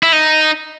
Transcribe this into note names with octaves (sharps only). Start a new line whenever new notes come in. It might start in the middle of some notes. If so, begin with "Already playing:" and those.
E4
D#4